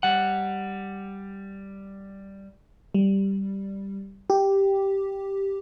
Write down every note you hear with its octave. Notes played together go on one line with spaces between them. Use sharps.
G3 F#5
G3
G4